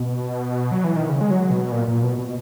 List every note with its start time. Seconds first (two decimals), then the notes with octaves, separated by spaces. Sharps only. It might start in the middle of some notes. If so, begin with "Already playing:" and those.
Already playing: B2
0.72 F#3
0.84 E3
0.96 D#3
1.09 C#3
1.21 G#3
1.31 F#3
1.51 B2
1.72 A#2
1.88 A#2
2.03 B2
2.18 B2